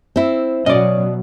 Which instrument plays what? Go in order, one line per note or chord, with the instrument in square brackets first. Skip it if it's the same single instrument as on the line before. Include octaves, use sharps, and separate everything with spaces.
[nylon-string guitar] C4 E4
[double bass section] B2 F#3 [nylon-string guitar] C#4 [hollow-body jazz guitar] D5 D#5